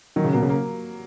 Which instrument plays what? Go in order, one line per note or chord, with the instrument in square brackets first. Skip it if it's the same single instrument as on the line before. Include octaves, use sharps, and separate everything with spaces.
[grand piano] D#3 [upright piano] F#3
[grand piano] C#3
[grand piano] B2 [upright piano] A#3
[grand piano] C#3
[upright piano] A#3